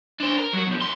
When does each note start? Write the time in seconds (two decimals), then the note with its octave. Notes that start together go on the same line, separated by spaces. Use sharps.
0.20 D4 C5
0.38 A#4
0.53 F#3 F#4
0.67 B2 F3
0.81 E2 C6